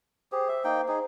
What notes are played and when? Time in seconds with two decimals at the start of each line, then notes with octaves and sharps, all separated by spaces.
0.32 G4 G#4 C5
0.48 E5
0.64 A#3 D#4 G5
0.88 D#4 G#4